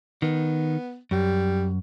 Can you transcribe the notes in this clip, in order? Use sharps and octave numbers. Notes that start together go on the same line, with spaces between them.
D#3 B3
F#2 G3